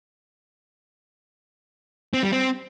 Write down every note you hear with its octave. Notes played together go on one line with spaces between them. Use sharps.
C4
G3
C4